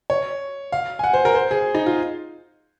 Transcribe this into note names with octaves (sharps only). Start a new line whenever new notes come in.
C#5
F5
G#5
F#5
C5
A#4
C5
G#4
D#4
F4